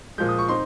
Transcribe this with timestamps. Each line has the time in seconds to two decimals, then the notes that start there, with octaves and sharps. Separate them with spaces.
0.18 A#2 F3 G#3 G6
0.29 D#6
0.39 C#6
0.49 C4 D#4 C6